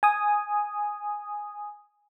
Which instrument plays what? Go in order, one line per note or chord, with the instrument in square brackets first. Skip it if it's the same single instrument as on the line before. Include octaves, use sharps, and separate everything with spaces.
[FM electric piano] G#5 D#6